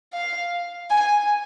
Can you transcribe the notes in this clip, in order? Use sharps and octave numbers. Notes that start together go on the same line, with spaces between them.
F5
G#5